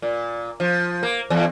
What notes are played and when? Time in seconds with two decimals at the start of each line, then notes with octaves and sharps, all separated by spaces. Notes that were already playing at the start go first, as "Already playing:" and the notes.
0.02 A#2
0.60 F3
1.03 A#3
1.30 E2